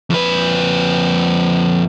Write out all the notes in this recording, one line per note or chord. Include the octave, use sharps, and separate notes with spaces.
F2 B4